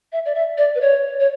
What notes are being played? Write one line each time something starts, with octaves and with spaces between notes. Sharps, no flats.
E5
D5
E5
D5
B4
C#5
C#5